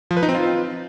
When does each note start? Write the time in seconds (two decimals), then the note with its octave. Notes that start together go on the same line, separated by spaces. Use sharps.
0.11 F3
0.17 B4
0.23 D#4
0.29 C4
0.35 F4